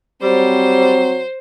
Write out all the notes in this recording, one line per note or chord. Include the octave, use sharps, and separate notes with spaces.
F#3 G3 C4 C5